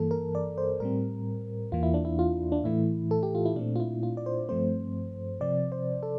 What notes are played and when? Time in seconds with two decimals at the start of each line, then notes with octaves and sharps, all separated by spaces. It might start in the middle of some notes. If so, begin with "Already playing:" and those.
Already playing: G2 E3 A#3 A4
0.11 A#4
0.35 D5
0.58 C5
0.80 A2 G3 C4 A#4
1.72 E2 E3 A#3 F4
1.83 E4
1.94 D4
2.05 E4
2.19 F4
2.52 D4
2.64 A2 E3 A3 E4
3.11 A4
3.23 G4
3.35 F4
3.46 E4
3.56 A#2 A3 C4 D4
3.76 F4
3.80 E4
4.03 F4
4.17 D5
4.26 C5
4.49 G2 F3 A3 C4 C5
5.41 C3 F3 C4 D5
5.72 C5
6.03 A4